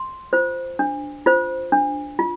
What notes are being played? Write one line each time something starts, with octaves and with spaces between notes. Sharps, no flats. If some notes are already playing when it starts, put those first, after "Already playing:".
Already playing: C6
F4 C5
D4
F4 C5
D4
F4